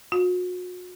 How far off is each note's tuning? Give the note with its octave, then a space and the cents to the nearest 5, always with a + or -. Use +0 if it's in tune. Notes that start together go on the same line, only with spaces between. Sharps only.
F#4 -40